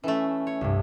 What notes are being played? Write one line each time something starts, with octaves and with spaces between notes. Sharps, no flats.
E3 A3 C#4 A4 E5
C#5
C2 G2